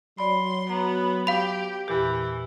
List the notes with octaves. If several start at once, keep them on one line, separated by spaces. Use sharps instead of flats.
F#3 D5 B5 C6
B3 A#5
G4 F5 B5
E2 A#2 E3 G4